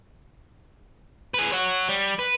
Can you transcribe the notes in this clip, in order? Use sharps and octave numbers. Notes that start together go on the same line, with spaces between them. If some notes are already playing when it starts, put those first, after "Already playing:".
G#4 B4
C#5 F#5
G3
B4